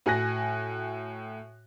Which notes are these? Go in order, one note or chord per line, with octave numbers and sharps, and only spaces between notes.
A2 F#4 G#5 F#6 A#6